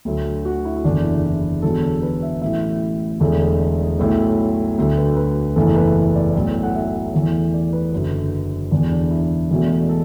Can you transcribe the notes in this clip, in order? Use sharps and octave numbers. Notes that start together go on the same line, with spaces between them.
D2 D3 F#3 A3
F#4
E4
E4
F#1 E2 D3 D4
E4
E4
E1 E2 D3 F#3 A4
B4
E5
A1 A2 F#3 E5
E1 E2 D3 A3
B1 A2 F#3 A3
D2 D3 F#3 A3
B4
B4
F#1 E2 E3 A3 A4
B4
B4
D5
B1 A2 F#3 A3 D5
F#5
E5
E2 E3 A3
D5
B4
F#1 F#2 D3 F#3 B4
E1 E2 D3 D4
D4
E4
E1 E2 B2 A3
A4